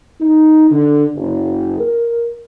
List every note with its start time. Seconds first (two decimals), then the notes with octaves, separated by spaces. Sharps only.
0.19 D#4
0.69 D3
1.15 F#1
1.79 A#4